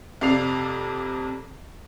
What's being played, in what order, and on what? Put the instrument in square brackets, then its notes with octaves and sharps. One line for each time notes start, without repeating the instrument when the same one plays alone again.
[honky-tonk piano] F2 C3 D5 C7 F7